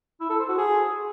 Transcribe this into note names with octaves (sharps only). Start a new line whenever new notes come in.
E4
A4
C5
F#4
G#4